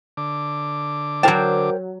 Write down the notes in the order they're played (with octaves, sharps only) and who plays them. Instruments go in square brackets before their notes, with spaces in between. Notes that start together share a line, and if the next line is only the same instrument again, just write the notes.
[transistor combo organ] D3 D6
[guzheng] F#3 A5 [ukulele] A#4 C5 G5